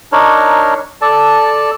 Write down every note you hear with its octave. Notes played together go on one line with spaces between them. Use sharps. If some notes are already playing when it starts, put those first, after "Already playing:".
D4 D#4 A#4 C#5
A4 D5 A5